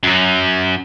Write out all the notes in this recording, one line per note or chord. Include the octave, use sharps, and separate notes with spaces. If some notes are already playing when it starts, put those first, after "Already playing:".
F#2 F#3